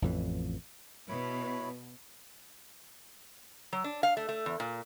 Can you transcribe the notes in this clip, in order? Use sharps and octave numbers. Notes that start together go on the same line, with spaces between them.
A1 F2 E3
B2 E4 C#5 B5
F#3
D4
F5
A3
A3
E2
A#2